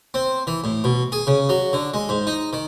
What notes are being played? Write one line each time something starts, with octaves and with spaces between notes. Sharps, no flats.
C4
E3
A2
B2
G#4
C#3
F#3
D3
G#3
G#2
D#4
D#3